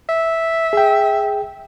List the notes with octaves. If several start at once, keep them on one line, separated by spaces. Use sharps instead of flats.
E5
G#4 G5